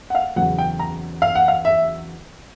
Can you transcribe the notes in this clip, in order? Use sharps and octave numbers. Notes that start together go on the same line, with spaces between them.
F#5
F5
E2 C#3 F#3 F#5
G5
A#5
F5
F#5
F5
E5